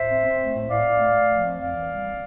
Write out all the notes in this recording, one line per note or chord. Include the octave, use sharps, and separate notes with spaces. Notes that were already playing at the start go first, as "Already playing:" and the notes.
Already playing: A2 C5 E5
C4
C4
A3
A2
A2 D5 F5
A2
A3
A3
F3
C4
F2 D5 F5
E3
G3